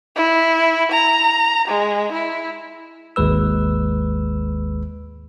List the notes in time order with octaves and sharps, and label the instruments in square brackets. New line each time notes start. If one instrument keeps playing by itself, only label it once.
[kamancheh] E4
A#5
G#3
E4
[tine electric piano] G#1 D#2 G#3 B4 E6